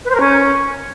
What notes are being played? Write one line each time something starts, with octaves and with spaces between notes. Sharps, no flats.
B4
C5
A#4
C#4